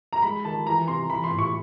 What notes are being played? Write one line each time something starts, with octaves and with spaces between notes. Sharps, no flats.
A#5
G#3 B5
D#3 A5
E3 A#5
C3 C6
E3 B5
C6
A2
C#6